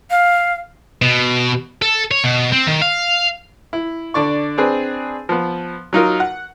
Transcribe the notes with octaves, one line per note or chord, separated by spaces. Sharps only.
F5
B2
A4
C#5
B2
C4
D#3
F5
E4
D3 D4 D5 C#6
C4 D4 G#4 B4
F3 B3
F#3 D#4 F4 A#4
F#5